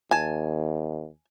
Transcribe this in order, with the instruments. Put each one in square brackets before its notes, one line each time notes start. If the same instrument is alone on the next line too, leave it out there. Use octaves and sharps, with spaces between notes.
[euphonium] D#2 [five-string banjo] G#5 A5